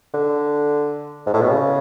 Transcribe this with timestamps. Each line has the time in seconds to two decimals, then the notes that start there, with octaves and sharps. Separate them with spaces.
0.14 D3
1.26 G#2
1.34 A2
1.41 B2
1.49 C#3